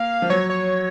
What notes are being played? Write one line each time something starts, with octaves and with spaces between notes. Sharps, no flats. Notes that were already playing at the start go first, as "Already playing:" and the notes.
Already playing: A#3 F5
F3
F#3 C#5
C#5